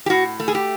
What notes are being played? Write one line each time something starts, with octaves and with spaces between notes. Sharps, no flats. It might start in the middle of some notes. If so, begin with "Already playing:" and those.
G4
A2 F#4
A3
G#4
G4